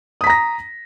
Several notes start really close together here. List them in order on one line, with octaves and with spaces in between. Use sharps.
D#6 B6 A#5 A#6